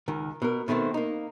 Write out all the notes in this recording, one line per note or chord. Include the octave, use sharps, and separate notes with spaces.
C#2 D#3
B2 A#4
B2 D#3 A3 B3 C4
A#3 D#4